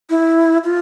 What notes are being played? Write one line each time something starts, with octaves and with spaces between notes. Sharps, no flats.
E4
F4